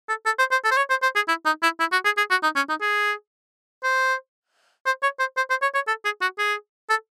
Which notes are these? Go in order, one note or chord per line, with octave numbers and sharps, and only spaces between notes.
A4
A4
C5
C5
A4
C5
C#5
C5
C5
G#4
E4
D#4
E4
E4
F#4
G#4
G#4
F#4
D#4
C#4
D#4
G#4
C5
C5
C#5
C5
C5
C5
C#5
C#5
A4
G#4
F#4
G#4
A4